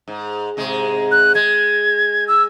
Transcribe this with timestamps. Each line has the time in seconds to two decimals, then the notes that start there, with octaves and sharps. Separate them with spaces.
0.08 G#2
0.57 G#2 C3 G#3
1.11 F#6
1.35 G#3 G#6
2.28 E6